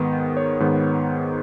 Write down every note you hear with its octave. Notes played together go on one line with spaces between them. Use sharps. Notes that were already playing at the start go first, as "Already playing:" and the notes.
Already playing: G#2 D#3 B3
C#5
G#2 D#3 B3